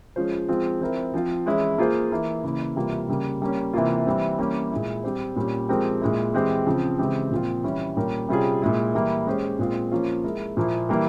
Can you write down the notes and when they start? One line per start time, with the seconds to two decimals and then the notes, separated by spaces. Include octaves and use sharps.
0.16 F3 G#3 C#4 F4 C5
0.49 F3 G#3 C4 F4
0.81 F3 C4 E4 A#4
1.14 F3 C4 F4
1.46 E3 G#3 C#4 E4
1.78 A#3 F4 G#4 C5
2.11 E3 A#3 E4
2.43 C#3 E3 A#3 E4
2.76 C3 E3 G3 A#3 F4
3.09 C#3 G3 A#3
3.42 G3 A#3 C#4
3.74 C3 E3 A#3 F4
4.07 E3 G3 C4
4.39 E3 G3 A#3 C#4 G4
4.71 A#2 G#3 E4
5.04 G3 C4 G4 C5
5.36 A#2 G3 C#4 G4
5.69 F3 G#3 C4 G4 A#4
6.01 A#2 G#3 E4
6.34 E3 G#3 C4 G4 C5
6.67 C#3 F3 C4
6.99 C#3 E3 G#3 C4 G4
7.31 A#2 F3 C4 F4
7.64 E3 G3 C#4
7.97 A#2 G3 C#4 G4 A#4
8.29 C3 G3 C#4 F4 G#4
8.62 A#2 G#3 E4
8.94 E3 G3 A#3 E4
9.27 G#3 C#4 G4 C5
9.59 A#2 G#3 C4 F4
9.92 F3 A#3 C#4 F4
10.24 G#3 E4 A#4
10.57 A#2 F3 A#3 E4
10.89 E3 G3 A#3 E4